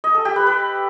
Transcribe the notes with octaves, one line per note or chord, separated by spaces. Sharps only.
D#5
A4
G4
B4
B4